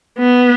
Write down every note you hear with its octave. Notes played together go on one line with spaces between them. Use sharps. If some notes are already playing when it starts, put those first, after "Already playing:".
B3